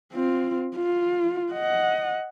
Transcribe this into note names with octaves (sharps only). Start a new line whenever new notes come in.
C4 F4
F4
D#5 F#5